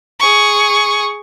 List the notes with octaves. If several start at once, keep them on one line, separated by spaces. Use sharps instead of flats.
G#4 C#6